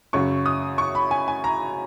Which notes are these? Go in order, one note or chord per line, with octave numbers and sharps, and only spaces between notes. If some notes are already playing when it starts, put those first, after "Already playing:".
F#2 C#3 F#3 C#6
D#6
C#6
B5
G#5
G#5
A#5